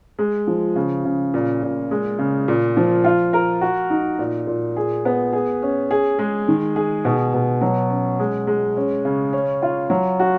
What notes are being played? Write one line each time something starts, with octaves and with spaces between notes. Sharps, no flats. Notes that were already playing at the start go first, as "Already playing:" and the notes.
G#3
F3
C#3
C#3
A#2
A#2
G#3
C#3
A#2
F3
F4
A#4
F#4
D#4
A#2
A#2
G#4
B3
G#4
C#4
G#4
G#3
D#3
G#4
B2
B2
F#3
C#4
G#3
G#3
C#4
C#3
C#4
F4
F#3
F#4